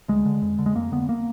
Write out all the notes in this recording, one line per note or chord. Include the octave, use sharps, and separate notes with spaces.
D2 G#3
D3
F2
D3
G#3
F2 A#3
D3 B3
A#3